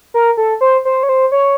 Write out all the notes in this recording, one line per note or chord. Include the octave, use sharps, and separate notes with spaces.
A#4
A4
C5
C5
C#5
C5
C#5